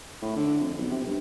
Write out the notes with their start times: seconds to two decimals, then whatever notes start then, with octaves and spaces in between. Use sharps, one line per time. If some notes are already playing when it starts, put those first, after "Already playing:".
0.22 A2
0.36 D3
0.61 F2
0.77 B1
0.91 C3
1.07 G2